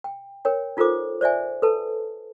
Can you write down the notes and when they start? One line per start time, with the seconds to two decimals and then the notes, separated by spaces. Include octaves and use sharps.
0.04 G5
0.45 A#4 C#5 G5
0.77 D#4 F4 A4 A#4 C5 D6
1.21 C5 D5 E5 G#5
1.62 A4 B4 A5